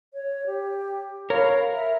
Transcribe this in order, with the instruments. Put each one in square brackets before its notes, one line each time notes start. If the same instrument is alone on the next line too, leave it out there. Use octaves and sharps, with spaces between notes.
[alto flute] C#5
G4
[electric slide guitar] A#4 [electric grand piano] C#5 B5 [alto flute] F5
[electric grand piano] B5
[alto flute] E5